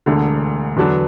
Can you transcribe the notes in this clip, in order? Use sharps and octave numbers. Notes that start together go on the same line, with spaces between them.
E1 D2 D3
E2 D3 F#3 D4 B4